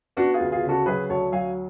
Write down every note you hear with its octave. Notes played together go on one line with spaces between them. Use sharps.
B3 D4 F#4
F4 G#4
D2
F4 G#4
C#3
F#4 A4
F#3 G#4 B4
D2 A4 C#5
F#3 F5 G#5